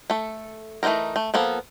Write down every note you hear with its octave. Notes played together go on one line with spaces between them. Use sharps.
A3 A4
E3 A3 C4 D#4 A#4
A3
F3 A#3 B3 A4